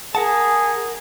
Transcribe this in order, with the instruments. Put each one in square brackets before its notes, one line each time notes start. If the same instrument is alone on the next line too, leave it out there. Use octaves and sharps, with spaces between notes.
[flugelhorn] G#4 [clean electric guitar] A#4 F#5 A5